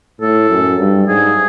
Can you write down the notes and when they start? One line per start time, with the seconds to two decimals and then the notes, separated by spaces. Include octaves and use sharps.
0.20 A2 A4
0.49 F#2
0.79 G2
1.08 G#2 G#4